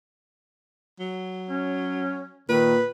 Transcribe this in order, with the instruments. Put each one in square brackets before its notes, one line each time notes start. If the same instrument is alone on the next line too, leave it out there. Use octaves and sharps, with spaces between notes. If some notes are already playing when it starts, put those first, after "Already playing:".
[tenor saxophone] F#3
[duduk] C#4
[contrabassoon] A#2 [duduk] D#3 [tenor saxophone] B4